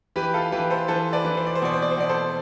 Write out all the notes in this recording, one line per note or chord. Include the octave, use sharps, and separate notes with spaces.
E3 G4 B4
F4 A4
E3 G4 B4
A4 C5
E3 A4 C5
B4 D5
E3
C5
D5
C5
B2 D5
C5
D5
C5
B2 D5
A4 C5